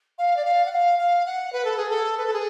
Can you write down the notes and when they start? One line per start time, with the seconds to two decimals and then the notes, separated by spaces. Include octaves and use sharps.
0.18 F5
0.37 D5
0.45 F5
0.65 F#5
0.72 F5
0.99 F5
1.26 F#5
1.53 B4
1.65 A4
1.77 G#4
1.90 A4
2.18 B4
2.26 A4
2.33 G#4